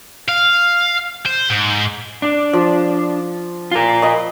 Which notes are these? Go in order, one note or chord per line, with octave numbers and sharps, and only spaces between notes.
F5
C5
G#2
D4
F3
F4 A#4
D#5 B5